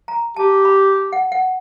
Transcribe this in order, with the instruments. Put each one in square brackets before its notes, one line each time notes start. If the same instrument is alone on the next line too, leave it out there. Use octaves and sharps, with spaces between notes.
[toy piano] A#5
[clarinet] G4 [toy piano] A5
[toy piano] B5
F#5
F#5